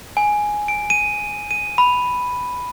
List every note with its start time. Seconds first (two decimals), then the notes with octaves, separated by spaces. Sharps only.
0.17 G#5
0.68 D7
0.90 D#7
1.51 D#7
1.78 B5